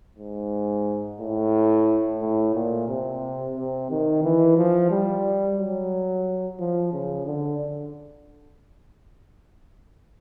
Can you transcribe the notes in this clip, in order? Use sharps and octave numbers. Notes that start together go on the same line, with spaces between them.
G#2
A2
A2
A#2
C3
C3
D#3
E3
F3
G3
F#3
F3
C#3
D3